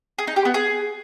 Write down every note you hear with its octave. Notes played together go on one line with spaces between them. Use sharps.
G#4
D#4
G4
B3
G#4